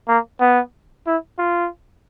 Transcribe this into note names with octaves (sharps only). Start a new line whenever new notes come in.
A#3
B3
E4
F4